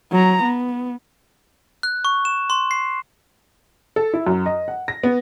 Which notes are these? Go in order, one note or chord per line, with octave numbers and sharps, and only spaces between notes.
F#3 A#5
B3
F#6
C#6
E7
C6
C7
A4
E4
F#2
D#5
F#5
A#6
B3